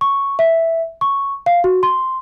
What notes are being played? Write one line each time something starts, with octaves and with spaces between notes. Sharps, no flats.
C#6
E5
C#6
F5
F#4
C6